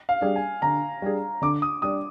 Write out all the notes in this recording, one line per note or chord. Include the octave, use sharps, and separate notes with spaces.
F5
G3 D4 G#4
G#5
D3 A#5
G3 D4 G#4
D3 D6
D#6
G3 D4 D#6